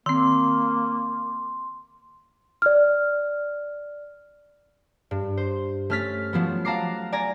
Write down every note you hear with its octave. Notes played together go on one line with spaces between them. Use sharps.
D#3 A#3 C4 C6
D5 F6
G2
C5
A3 C#4 F6 A6 B6
F3 F#3 B3
F5 F#5 A5 A#5 D6 C7
D5 G#5 A#5